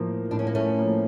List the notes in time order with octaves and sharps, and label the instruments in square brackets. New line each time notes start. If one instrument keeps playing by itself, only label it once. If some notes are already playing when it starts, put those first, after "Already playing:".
Already playing: [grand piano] A2 F3 A#3
[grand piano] A2 [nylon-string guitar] D4
[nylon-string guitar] C#4
A#3
A3 C#4
[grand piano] F3 A#3